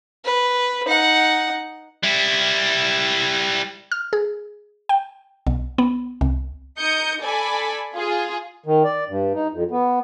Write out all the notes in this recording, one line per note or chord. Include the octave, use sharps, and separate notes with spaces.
B4
D#4 F#5
G3 E4
F6
G#4
G5
B1
B3
C2
D#4 D#6 G6 C#7
A4 D5 G#5 B5
F4 G#4
D#3
D5
G2
D#4
F2
B3